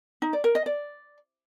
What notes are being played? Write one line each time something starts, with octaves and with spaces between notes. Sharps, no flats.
D#4
D5
A#4
D#5
D5